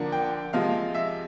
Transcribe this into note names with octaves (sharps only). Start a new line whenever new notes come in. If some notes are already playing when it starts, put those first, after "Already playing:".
Already playing: D3 F3 A#3 D4
G5
C3 F3 G#3 F5
E5